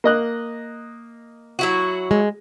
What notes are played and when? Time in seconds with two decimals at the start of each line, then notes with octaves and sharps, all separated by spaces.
0.04 A#3 D#5 F#6
1.59 F#3 E4 F#4
2.11 G#3